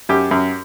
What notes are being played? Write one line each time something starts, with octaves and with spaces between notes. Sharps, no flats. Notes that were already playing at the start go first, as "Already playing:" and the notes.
F#2 G4
F#2